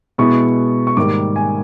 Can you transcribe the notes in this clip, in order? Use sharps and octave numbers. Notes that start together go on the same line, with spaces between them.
B2 G#3 B3 E4 C#6
C#6
G#2 D#3 G3 A#3 D6
G#5